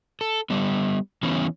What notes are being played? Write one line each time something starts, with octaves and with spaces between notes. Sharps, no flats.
A4
G3 B3
E3 B3 C#4